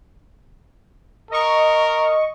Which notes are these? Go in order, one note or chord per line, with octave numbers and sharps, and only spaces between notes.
A#4 D#5 C#6